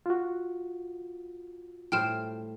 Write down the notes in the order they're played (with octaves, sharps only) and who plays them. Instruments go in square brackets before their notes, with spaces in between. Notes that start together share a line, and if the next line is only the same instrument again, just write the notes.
[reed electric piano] F4 F#4
[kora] A2 G3 C5 [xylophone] G5 F6 E7